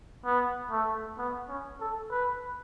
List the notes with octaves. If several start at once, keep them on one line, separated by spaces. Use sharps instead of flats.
B3
A3
B3
C#4
A4
B4